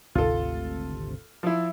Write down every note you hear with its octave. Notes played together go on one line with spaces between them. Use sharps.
G#1 D2 C3 F4 A4
F3 E4